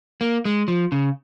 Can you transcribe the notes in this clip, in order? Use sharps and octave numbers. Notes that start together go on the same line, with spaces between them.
A#3
G#3
F3
C#3